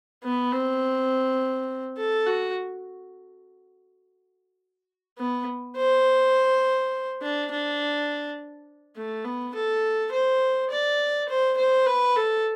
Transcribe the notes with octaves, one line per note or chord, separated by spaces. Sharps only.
B3
C4
A4
F#4
B3
C5
D4
D4
A3
B3
A4
C5
D5
C5
C5
B4
A4